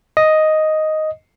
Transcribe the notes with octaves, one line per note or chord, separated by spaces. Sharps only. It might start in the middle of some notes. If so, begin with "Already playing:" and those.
D#5